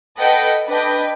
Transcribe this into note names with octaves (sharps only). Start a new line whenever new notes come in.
A4 B4 D#5 F#5 G5
D4 B4 D#5 G5